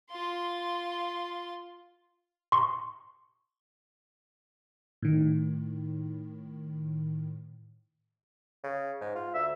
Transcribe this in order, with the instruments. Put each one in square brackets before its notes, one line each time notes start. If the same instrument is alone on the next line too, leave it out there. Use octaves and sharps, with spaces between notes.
[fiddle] F4 C6
[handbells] C6 C#6
[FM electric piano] A2 D#3
[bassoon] C#3
G#2
F4
[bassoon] D2 [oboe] E5